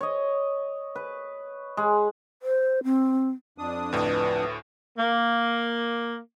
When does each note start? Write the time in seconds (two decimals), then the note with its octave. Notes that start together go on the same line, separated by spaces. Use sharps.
0.01 C#5 D#5
0.95 B4
1.77 G#3
2.42 C5
2.84 C4
3.58 F2 D4 D#6
3.93 D2 A2 B4
4.98 A#3